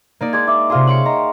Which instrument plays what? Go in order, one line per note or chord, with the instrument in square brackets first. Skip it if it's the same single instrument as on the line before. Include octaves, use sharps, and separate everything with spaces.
[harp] A#3 D#4 D5
[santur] G#3 D6 [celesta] G#6
[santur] E5 [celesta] D6
[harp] C3 F4 G#4 [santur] F5 C6
[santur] C#5 G5 C6 [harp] E5 D6 C#7 [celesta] F#7
[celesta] D#5 [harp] A#5 [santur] C6